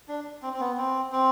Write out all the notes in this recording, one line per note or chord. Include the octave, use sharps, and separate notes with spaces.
D4
C4
C4
B3
C4
C4